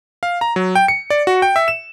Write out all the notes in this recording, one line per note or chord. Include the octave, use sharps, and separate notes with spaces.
F5
A#5
F#3
G5
C#7
D5
F#4
G5
E5
E7